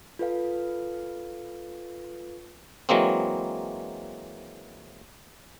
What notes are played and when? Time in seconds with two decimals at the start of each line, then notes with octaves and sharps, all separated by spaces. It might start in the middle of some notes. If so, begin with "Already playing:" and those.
0.19 F4 A4 B4 F5
2.89 E3 F#3 G#3 A#3 C4